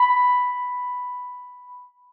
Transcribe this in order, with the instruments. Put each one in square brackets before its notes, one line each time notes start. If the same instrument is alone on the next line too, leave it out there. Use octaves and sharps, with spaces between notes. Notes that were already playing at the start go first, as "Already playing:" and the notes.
Already playing: [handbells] B5